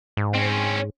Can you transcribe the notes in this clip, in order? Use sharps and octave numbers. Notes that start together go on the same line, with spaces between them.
G#2
C4 C#4